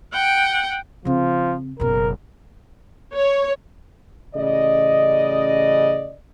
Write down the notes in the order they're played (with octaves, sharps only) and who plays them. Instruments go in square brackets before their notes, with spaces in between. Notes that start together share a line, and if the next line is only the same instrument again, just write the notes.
[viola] F#5 G5
[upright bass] C#3 C4 [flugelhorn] F3
[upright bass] F#1 B2 [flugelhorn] A#4
[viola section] C#5
[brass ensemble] A1 C#3 D5 D#5